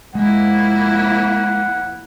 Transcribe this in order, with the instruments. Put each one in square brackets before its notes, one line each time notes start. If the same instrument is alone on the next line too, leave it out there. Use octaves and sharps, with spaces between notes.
[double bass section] F1 F3 [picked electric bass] G#3 [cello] A#3 E4 [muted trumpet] F#5